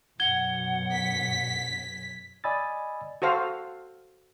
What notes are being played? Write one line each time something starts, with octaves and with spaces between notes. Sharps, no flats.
F#2 B2 F#5 G#6 G7
B6
D5 D#5 G#5 B5 E6 A6
F#4 A4 C5 F5